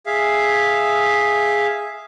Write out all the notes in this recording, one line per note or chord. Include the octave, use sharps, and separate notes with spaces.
G#4 E5 F5